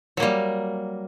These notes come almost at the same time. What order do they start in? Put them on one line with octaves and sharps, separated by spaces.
F#3 A#3 G3